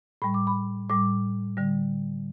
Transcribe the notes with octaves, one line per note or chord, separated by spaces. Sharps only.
A2 G3 B5
D6
B5
A2 G3 D6
D3 G3